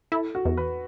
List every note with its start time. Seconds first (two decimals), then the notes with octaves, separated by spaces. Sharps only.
0.12 E4 A4
0.35 F#4
0.45 E2
0.57 B4